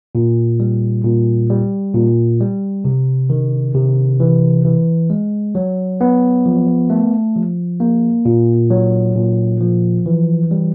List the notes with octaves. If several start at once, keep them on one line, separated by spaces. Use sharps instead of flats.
A#2
G3
A#2
G3
A#2
G3
C3
D#3
C3
E3
E3
G#3
F#3
B3
F3
A3
F3
A#3
A#2
F#3
A#2
F3
E3
G3